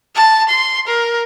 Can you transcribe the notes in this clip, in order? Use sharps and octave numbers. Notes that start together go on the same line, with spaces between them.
A5
C6
A#4